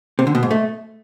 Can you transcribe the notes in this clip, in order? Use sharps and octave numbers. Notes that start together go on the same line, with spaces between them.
C3
D3
B2
G#2
A3